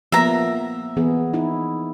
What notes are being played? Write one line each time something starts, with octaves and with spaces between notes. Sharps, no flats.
F3 A#3 B3 E5 A#5
E3 B3 G#4
D#4 E4